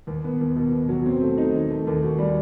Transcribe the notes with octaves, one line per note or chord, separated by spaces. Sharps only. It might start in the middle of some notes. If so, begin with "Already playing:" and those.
D#2
B3
D#2
B2
B3
F#3
C4
A3
D#4
D#2
A3
D#2
F#4
G3